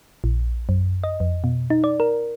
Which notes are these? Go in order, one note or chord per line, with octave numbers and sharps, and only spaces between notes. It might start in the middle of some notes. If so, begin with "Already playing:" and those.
A#1
F#2
D#5
F2
B2
D#4
D5
A#4